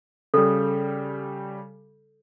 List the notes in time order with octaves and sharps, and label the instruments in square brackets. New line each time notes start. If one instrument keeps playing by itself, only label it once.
[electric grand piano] C#3 G3 [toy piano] A4